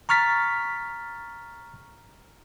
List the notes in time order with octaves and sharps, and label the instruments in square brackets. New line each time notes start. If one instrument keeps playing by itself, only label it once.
[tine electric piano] A#5 C#6 F6 A6 B6